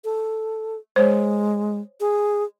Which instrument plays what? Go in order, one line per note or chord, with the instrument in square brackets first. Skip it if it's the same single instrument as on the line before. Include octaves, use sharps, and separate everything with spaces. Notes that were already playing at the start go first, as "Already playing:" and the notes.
[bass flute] A4
[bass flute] G#3 [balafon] C5 C#5
[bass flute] G#4